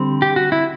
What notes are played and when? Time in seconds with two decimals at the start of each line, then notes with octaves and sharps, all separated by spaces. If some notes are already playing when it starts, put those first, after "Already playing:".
Already playing: D3 G3 C4
0.22 G4
0.36 F#4
0.52 E4